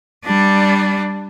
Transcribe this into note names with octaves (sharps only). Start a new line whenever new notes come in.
G3 D4